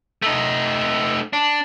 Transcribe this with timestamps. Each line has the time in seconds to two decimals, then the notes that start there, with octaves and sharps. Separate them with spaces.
0.22 A3 D#4
1.33 D4